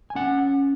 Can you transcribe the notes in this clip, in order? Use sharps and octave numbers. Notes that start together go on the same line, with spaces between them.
G#5
C#4 F#5